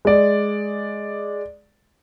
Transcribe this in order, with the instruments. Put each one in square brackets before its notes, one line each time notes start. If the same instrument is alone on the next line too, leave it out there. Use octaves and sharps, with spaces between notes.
[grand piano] G#3 D5